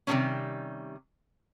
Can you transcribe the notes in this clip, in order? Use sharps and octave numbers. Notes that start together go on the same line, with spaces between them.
C3 D#3 F#3 G3 A#3 C#4